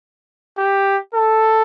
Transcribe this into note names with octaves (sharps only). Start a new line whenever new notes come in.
G4
A4